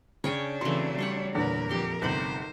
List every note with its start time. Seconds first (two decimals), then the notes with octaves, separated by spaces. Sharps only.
0.24 C#3 C#4 D4 C#5 G5 G#5
0.61 C#3 E3 F#3 A3 C4 C6
0.98 G3 A4 C#5 F#5
1.35 E2 A#2 D3 A#4 B4
1.69 F2 G4 A4 C6
2.02 G1 C3 D#4 A4 C5 B5